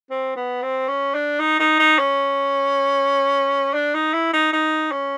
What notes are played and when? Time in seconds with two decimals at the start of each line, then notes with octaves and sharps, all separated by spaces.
0.10 C4
0.36 B3
0.62 C4
0.88 C#4
1.14 D4
1.40 D#4
1.60 D#4
1.79 D#4
1.99 C#4
3.74 D4
3.94 D#4
4.13 E4
4.33 D#4
4.53 D#4
4.92 C#4